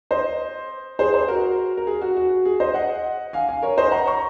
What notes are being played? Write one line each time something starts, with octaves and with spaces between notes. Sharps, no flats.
C5 D#5
G#4 C5
G#4 C5
F#4 A#4
A#4
G#4
F#4
F#4
G#4
C5 D#5
D#5 F#5
F5 G#5
F5 G#5
A#4 C#5
C5 D#5
F#5 A#5
A#5 C#6